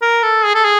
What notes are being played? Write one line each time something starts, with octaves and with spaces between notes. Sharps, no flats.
A#4
A4
G#4
A4
G#4